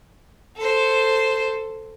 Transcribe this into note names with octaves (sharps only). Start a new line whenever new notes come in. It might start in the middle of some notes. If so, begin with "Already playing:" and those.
A4 C5